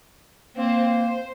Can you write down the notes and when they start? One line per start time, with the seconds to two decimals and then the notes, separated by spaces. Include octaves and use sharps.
0.56 A#3 C4 C5
0.89 C5